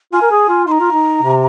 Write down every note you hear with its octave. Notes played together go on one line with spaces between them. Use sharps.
F4 G#5
A#4
G#4
F4
D#4 A#5 C6
F4
D#4
C3